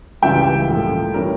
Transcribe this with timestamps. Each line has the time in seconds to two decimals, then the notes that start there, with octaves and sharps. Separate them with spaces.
0.22 C#2 C#3 E3 G3 E5 G5
0.69 A2 F3 A#3
1.14 E3 G3 C#4 E4 A#4